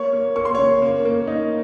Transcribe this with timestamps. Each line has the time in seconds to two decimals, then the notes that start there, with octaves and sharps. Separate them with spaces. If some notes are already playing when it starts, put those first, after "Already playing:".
Already playing: A#3 C#5 C#6
0.13 A#3
0.36 A#3 C#6
0.45 C6
0.55 C#3 C#5 C#6
0.82 A#3
1.05 A#3
1.27 D#4